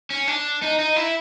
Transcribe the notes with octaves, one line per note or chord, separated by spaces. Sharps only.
C#4
D4
D#4
D#4
E4